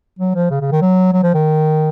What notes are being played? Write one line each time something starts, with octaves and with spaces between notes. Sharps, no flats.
F#3
F3
C#3
C#3
D#3
F#3
F#3
F3
D#3